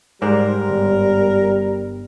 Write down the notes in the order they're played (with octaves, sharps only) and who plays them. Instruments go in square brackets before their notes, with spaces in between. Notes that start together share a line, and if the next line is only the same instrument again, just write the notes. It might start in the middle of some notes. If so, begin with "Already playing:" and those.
[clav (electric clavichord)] G#2 C5 D5 [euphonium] G3 [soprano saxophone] A#4
[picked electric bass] G1